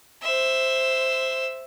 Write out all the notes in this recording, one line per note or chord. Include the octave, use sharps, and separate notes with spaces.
C5 E5